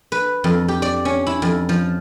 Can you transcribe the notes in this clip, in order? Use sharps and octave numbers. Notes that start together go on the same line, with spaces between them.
B4
F2
G4
D5
C#4
E4
F2
F3